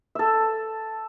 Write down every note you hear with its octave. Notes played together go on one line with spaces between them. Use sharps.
A4 E5